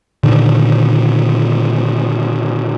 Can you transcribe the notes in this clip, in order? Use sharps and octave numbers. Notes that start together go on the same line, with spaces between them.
A#2 D3 D#3